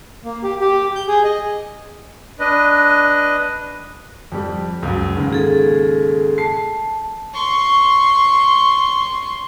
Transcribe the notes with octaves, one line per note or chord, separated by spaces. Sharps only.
A#3
G4
G4
G6
G#4
D#5
D4 B4 D#5
F2 G3
C#2 F#2
D#2 G#2 C#3
G#4 A4
A5 C7
C6 C#6